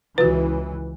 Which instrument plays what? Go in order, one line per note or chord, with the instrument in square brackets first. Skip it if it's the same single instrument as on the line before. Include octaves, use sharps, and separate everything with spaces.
[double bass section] C#2 E3 [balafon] F4 F#4 [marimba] B4